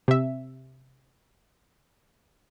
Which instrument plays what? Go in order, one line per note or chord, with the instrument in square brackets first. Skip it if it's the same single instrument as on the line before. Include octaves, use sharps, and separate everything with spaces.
[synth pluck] C3 E5